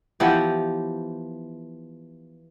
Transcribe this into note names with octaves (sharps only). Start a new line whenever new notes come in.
E3 F3 B3 G4